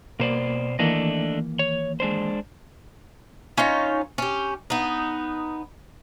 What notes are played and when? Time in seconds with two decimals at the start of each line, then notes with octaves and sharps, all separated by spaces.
0.20 B2 A#3 C5 D5
0.79 D#3 E3 A3 A#3 D4 D#5
1.59 C#5
2.00 G#3 D4 C5
3.57 C#4 D#4 F4 C#5
4.18 C#4 G4
4.70 B3 D#4